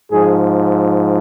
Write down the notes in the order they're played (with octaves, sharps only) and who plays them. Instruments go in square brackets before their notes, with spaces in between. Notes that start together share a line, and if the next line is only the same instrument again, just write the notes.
[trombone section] G#2 F3 G#4